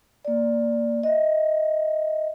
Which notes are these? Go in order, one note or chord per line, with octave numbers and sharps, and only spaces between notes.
A#3 D5
D#5 E5